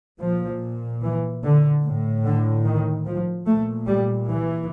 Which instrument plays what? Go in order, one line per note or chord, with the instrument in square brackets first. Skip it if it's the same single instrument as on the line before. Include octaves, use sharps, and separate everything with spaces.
[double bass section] A#2 F3
E3
D3
A2
D3
D#3
F3
A#2 A3
G3
E3